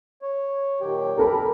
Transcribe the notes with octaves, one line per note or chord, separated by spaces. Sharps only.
C#5
A#2 D#3 F#3 G4
A4 A#4 A#5 B5